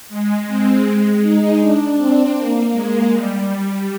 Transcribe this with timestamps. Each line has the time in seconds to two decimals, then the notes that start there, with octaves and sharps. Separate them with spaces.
0.09 G#3
0.47 C4
0.84 G#3
1.22 D#4
1.59 D4
1.97 C4
2.35 A#3
2.72 G#3
3.10 G3